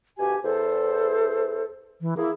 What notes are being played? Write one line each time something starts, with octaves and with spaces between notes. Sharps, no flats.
D2 B2 G4 G#5
E2 A4 C5
E3
E3 A#3 E4 G#4